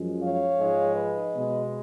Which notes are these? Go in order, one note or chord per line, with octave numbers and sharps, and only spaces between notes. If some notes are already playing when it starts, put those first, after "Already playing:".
Already playing: F#2 F3 G#3
C#5 F5
G#2 F3 G#3
B4 D#5
B2 G#3